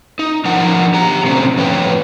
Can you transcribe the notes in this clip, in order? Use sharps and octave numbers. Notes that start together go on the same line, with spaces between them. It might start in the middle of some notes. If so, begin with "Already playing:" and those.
D#4
F3 D4 D#4 A#4 F#5 A#5
G4 A#5
B2 D3 A3 A#3 C4 C#4
F2 A2 E3 B4 C#5 G5